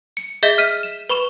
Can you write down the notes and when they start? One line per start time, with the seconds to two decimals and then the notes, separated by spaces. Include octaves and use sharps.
0.17 C#7
0.43 G#4 D#5 E5 G6 B6 G7
0.58 F6 B6 D#7
0.83 E7
1.09 B4 B5 C#6 E7